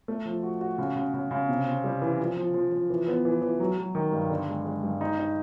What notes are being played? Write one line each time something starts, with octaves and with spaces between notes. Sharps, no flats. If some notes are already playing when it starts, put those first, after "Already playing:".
A3
F3
F#4
F#4
C#3
C#3
C#3
C#3
C3
C4
G3
E3
F3
F3
F3
F3
E3
B3
E3
E3
F#3
F#3
D#3
G2
D3
G#3
G#3
G2
D#4
D#4